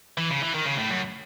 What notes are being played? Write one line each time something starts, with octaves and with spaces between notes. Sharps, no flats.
E3
C#3
E3
D#3
C#3
A2
F#2